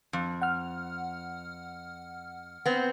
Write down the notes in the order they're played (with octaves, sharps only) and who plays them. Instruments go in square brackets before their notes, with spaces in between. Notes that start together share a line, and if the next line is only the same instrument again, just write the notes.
[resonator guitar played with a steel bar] F2
[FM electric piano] F#5 F6
[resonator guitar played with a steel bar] B3 C4